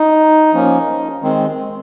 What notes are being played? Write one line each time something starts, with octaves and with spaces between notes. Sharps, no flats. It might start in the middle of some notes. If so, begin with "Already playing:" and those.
Already playing: D#4
F3 A#3 C#4
D#3 G#3 C4